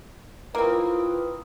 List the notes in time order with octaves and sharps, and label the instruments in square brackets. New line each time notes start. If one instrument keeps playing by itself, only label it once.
[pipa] A#3 C4 [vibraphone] E4 F4 D#6 [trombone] B4